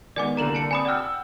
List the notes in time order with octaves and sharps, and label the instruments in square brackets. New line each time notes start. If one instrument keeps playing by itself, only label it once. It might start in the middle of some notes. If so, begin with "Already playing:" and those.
[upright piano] D#3 G#3 B3 [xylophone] D5 G#5 D6
[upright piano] C2 D3 A#3 [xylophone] A#5 E7 F#7
[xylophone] A5 C#7
[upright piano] C4 D5 [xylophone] G#5 B5 D#6
[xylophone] D5 F6 [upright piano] F#5 G5 E6